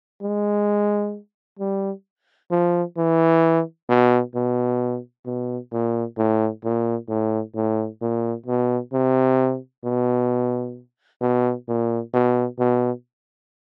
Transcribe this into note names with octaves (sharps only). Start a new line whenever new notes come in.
G#3
G3
F3
E3
B2
B2
B2
A#2
A2
A#2
A2
A2
A#2
B2
C3
B2
B2
A#2
B2
B2